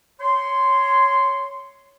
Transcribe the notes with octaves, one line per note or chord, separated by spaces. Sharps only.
C#5 C6